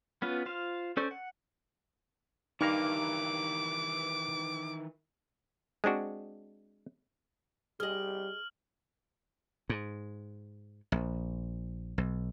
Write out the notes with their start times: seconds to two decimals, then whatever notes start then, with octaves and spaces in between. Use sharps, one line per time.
0.22 B3 C#4 F4 B4
0.46 F4 C5 F5
0.97 C#4 A4 C5 D5 C#6
1.11 F#5
2.61 G2 D#3 E3 A#3 D#4 A#5 D6
5.84 G#3 C4 D4 F#4
7.80 G3 G#4 D#5 F6 F#7
9.69 G#2
10.92 A#1
11.98 B1